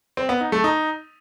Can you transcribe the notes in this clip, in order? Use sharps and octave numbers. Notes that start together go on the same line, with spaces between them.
C4
B3
D#4
A3
D#4